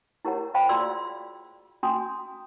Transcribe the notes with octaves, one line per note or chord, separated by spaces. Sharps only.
E4 G4 A#4 C#5 F#5 A#5
C5 F5 G5 A#5 B5
F4 F#4 G#4 D5 C6 E6
C#4 F#4 G#5 A#5 C6 D#6